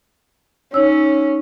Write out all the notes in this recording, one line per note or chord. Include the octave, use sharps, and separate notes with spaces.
C#4 D#4 C#5 E6